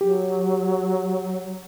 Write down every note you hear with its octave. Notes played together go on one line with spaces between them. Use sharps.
F#3 G4